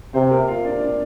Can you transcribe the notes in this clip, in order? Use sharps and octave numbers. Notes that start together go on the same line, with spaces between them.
C3 C4 C5
A#3 A#4
F4 F5
D4 D5
D4 D5